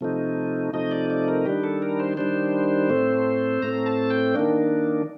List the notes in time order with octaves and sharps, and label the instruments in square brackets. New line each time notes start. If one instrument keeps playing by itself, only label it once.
[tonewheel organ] C3 F3 A3 D#4
C3 F3 A3 D#4 D#5
D5
D5
A#4
D#3 G3 D4 G4
A4
A#4
C5
D#3 G3 D4 C5
A2 A3 C4
A2 A3 C4 A#5
A5
G5
D#3 A#3 D4